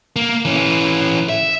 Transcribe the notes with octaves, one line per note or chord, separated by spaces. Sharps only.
A#3
E3 C#4
E5